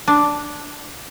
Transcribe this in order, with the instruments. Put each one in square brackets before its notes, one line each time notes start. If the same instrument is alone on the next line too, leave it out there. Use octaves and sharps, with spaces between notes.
[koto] D4